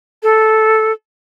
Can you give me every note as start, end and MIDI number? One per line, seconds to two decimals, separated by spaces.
0.23 0.92 69